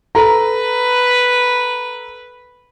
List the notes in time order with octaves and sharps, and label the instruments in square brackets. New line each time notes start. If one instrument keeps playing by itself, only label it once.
[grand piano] A4 A#5 [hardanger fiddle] B4